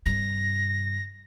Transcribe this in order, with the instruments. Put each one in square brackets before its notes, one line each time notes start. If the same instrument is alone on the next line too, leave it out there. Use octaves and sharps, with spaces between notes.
[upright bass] G2 C3 [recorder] A#6